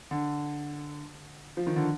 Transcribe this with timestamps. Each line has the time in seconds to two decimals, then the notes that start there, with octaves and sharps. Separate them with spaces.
0.11 D3
1.57 F3
1.67 D#3
1.76 D3